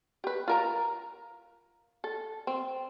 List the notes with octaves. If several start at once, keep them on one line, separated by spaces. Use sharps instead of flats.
G4 B4
F4 A#4 A#5
A4
C4